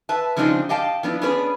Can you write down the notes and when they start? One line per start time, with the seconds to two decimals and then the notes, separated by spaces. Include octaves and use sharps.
0.09 B4 E5 A5
0.37 C#3 F3 G#3 C4 D4 D#4
0.69 G4 D#5 F5 G5 A5
1.03 F3 B3 D4 E4
1.22 B3 C#4 D4 G#4 B4